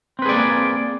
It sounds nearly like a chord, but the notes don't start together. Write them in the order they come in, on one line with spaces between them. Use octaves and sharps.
C4 B4 G#4 D5 A#3